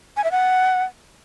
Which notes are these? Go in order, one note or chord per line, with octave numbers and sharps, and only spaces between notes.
G#5
E5
F#5